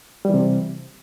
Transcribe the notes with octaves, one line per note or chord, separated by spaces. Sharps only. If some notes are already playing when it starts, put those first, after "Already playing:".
C3 E3 G3